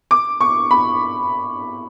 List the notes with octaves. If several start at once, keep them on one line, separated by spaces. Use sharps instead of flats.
D6
C#6
B5